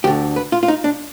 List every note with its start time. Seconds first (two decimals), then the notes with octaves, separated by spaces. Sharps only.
0.04 D2 D3 G4
0.36 B4
0.52 F4
0.63 F4
0.68 D#4
0.84 D4